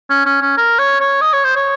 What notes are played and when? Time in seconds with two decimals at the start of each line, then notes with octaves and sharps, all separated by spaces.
0.10 C#4
0.26 C#4
0.41 C#4
0.57 A#4
0.78 C#5
1.00 C#5
1.21 D#5
1.33 C#5
1.44 C5
1.56 C#5